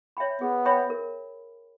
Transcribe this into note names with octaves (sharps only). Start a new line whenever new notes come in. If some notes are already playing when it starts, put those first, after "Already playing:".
C#5 E5 G5 B5
B3 G#4
C#5 E5 G5 B5
A#4